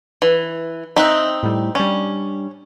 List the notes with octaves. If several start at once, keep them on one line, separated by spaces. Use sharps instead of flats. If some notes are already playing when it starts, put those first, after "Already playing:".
E3
C4 D#4 E5 F#6
A2 G3
G3 C#4 D4